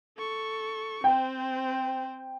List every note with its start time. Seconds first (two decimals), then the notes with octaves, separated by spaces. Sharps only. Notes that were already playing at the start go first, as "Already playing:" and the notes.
0.18 A4 C#6
1.04 C4 C5 G5